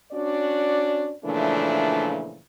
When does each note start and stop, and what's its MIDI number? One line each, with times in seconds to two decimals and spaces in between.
0.13 1.13 61
0.13 1.13 62
0.13 1.13 66
0.13 1.13 74
1.24 2.39 46
1.24 2.39 49
1.24 2.39 52
1.24 2.39 53
1.24 2.39 57
1.24 2.39 62